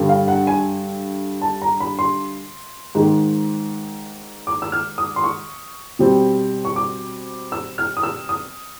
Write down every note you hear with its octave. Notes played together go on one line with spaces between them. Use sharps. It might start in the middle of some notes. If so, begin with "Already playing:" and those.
Already playing: G2 D3 G3
F5
F#5
G#5
A5
A#5
B5
C6
G#2 D#3 G#3
D6
E6
F6
D#6
C6
C#6
B2 G3 C4
C#6
D6
E6
F6
D#6
E6
D#6